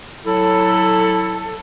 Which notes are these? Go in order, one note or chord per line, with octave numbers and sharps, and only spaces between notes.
F#3 E4 A4